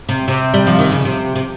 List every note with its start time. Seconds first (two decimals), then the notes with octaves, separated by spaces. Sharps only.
0.09 C3
0.28 C3
0.54 G3
0.67 F3
0.79 D#3
0.92 C#3
1.05 C3
1.36 C3